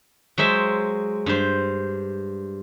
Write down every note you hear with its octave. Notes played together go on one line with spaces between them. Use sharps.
F#3 G#3 C5 E5
G2 C5